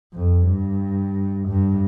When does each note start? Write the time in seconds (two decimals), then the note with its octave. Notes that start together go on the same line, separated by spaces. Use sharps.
0.13 F2
0.47 G2
1.48 G2